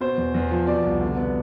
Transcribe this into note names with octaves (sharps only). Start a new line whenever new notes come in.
B2 C5
E2
E2
F3
B2 D5
C2
D3
B3